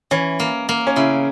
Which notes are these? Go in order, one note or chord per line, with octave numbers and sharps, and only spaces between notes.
E3 C#4
A#3
A#3
C#4
C#3 E4